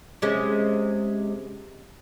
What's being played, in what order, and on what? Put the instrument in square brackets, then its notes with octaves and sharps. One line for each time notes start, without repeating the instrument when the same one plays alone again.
[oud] C3 G#3 C#4